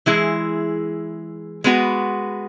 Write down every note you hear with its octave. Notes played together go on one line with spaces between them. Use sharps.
E3 G#3 E4 G#4
G#3 B3 F#4